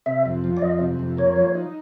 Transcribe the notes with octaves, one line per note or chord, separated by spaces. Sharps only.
C3 E5
F2
F3
D5
F2 D#5
C3
F2
A#3 C#5
F3
D#4